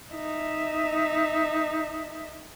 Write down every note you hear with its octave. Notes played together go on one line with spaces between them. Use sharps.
D#4 E5